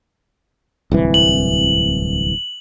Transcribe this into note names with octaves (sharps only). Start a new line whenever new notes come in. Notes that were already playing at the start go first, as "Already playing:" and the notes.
D1 C2 E3
F#7